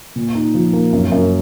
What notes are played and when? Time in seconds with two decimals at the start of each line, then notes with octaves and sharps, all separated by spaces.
0.16 A#2
0.35 D#4
0.54 F3
0.73 A#3
0.93 F#2
1.12 F#2